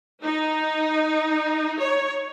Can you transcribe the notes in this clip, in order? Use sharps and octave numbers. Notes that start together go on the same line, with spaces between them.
D#4
C#5